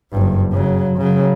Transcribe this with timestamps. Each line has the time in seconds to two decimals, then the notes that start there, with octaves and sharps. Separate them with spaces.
0.12 F#1 G2
0.52 C#3 F#3
0.97 C#3 F#3